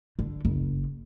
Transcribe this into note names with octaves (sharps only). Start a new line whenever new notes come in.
D3
F#1